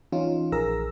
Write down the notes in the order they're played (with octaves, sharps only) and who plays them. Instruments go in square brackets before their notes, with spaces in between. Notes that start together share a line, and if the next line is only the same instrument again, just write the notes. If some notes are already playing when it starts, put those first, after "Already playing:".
[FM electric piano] E3 C#4 D#4 F4
A#1 G#4 A#4 E6 A#6